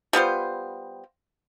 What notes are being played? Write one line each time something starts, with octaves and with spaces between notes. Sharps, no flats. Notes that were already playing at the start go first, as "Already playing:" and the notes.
G3 B3 F4 C5